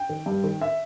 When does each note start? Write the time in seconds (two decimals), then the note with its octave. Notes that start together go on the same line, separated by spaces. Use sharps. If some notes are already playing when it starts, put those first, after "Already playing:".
Already playing: G5
0.09 D#3
0.26 G2
0.44 D#3
0.61 E5